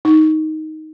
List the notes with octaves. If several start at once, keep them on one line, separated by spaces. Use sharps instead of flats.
D#4